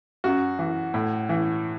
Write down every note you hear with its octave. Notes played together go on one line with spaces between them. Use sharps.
F#2 F#4
E3
A2
E3